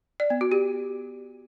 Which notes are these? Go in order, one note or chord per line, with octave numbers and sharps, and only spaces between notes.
D5
B3
F#4
G4